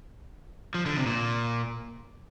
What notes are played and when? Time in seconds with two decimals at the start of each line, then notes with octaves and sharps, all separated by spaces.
0.74 F3
0.86 D3
0.97 C3
1.06 A#2